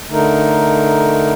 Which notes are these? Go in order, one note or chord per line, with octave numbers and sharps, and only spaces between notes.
D3 A3 D#4 A#4